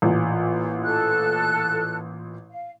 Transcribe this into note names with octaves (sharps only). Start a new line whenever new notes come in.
A1 A#2
A4 F#6
F5